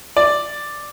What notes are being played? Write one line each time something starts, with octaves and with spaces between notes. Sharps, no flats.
D5